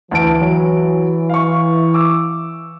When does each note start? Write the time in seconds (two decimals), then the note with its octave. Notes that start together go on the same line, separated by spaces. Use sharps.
0.11 D2 E3 A5 D7
0.41 F#3
1.30 F5 C#6
1.94 D6 E6